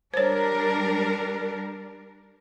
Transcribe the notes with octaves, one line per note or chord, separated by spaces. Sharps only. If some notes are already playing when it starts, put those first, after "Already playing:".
G3 D4 A#4 C5 C#5